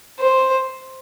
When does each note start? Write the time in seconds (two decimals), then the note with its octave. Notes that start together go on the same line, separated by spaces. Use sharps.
0.19 C5